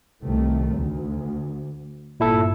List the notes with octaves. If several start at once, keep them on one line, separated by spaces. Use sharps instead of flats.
C2 D#3 A3
D2
G1 A#2 E4 A4